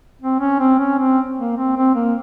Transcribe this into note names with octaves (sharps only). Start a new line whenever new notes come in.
C4
C#4
C4
C#4
C4
A#3
C4
C4
A#3